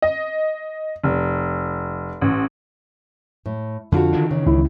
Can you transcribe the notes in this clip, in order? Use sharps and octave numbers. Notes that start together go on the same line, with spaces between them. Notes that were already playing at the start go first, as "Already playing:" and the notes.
D#5
F1
A1
A2
F2 D3 F4 F#4
D#3 E3 D4
C#3
C#2 E4